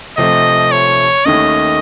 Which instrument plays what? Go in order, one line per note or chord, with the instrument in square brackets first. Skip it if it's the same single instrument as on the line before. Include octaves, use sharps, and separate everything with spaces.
[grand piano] C3 F3 A3 [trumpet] D#5
[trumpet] C#5
[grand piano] D#2 D#3 A3 C#4 [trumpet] D#5